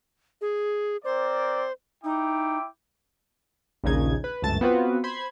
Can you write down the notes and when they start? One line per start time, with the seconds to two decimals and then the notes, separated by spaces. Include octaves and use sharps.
0.41 G#4
1.05 C4 A#4 C5 D5
2.04 D#4 E4 G5 D6
3.84 A#1 D#2 A#2 C#3 D#4 G#6
4.24 B4
4.42 G1 C#2 F#2 A3 A5 A6
4.61 B3 C4 F4 F#4 B4
5.04 C5 B5 C6 G#6